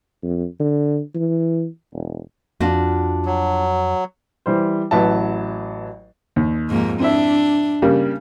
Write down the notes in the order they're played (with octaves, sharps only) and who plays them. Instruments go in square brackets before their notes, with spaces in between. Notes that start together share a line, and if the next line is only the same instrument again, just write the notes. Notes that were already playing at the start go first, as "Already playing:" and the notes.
[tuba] F2
D3
E3
E1
[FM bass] F2 [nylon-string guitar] D4 F4 F#4
[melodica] F#3
[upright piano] E3 G3 C5
A1 F#3 E4 B4 E5 A5
[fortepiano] D#2
[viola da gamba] F2 G#2 A#3
[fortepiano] C4 E4 E5 [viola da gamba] D4
[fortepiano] C#3 G3 A#3